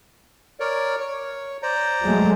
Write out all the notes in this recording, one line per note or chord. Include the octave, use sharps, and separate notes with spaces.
A#4 C#5 D5
C#5
C5 D5 A#5
F#3 G#3 A3